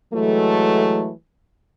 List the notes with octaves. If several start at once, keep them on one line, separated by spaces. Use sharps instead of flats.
E3 F#3 G#3 A3